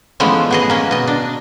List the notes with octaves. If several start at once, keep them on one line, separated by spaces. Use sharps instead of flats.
E3 F3 G#3 A3 B3 C#4
B3 G#4 D#5
A#3 C#4
B2 D#5
D4